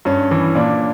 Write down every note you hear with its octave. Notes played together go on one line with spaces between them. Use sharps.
G2 C#4
E3
A#2 D4